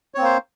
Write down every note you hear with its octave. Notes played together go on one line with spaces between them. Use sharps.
A#3 C4 C5 C#5